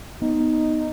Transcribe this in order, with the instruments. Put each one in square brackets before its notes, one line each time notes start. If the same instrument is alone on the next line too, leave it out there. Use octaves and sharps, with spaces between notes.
[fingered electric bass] B3 [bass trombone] D#4